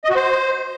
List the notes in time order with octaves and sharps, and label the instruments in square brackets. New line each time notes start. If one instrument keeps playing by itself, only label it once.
[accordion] D#5
F#4
C5